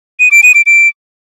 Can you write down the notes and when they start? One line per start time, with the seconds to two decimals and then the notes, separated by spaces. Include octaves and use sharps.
0.20 D#7
0.31 D7
0.43 D#7
0.55 D7
0.66 D7